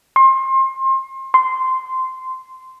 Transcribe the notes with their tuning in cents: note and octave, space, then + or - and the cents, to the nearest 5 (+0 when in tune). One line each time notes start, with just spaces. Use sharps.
C6 +30
C6 -10